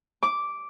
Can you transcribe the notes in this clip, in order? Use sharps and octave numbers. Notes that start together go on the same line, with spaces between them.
D6